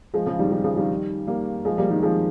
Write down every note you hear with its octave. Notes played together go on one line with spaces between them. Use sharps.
F3 G#3
C#3 F3
D#3 G3
D#3 G3
C#3 F3
D#3 G3
G3 A#3
F3 G#3
G3 A#3
D#3 G3
F3 G#3